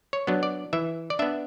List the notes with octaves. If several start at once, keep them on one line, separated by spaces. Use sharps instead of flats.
C#5
F#3 B3 D4
D5
E3 E5
D5
B3 D4 E5